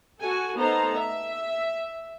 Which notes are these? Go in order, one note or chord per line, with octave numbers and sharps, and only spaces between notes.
F#4 A4 G#5
A3 B3 D#4 A4 C5 A#5
E5